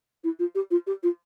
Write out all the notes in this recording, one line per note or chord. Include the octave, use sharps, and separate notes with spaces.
E4
F4
G4
F4
G4
F4